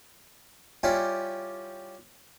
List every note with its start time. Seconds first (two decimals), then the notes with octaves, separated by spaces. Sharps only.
0.83 G3 C#4 E4 F4 G4